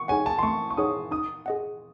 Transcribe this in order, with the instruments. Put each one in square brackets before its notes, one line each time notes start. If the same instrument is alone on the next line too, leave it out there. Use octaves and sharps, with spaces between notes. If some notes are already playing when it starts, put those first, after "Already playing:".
Already playing: [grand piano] C#6
[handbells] D#4 G#4 C#5 F#5 [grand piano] G#5
[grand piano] A5
C6
[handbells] A3 [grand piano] C#6
[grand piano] C#6
[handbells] D#4 G#4 C#5 F#5 [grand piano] D#6
[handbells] D#4 [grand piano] D#6
[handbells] G#4 D#5 F#5